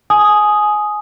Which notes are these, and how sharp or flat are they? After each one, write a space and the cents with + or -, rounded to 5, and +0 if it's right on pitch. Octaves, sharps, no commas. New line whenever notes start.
G#5 +20 D#6 +0